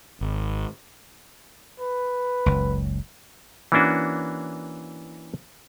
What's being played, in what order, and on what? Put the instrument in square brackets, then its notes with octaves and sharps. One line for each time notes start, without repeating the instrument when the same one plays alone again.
[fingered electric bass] G#1
[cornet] B4
[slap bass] F#1 C#2
[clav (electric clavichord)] E3 A#3 C#4 D4 F#4